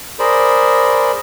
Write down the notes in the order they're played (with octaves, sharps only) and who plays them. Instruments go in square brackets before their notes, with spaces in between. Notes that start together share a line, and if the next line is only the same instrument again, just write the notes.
[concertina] G#4 A#4 C5 D5 B5